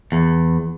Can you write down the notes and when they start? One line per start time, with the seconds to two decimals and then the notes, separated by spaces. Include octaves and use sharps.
0.12 E2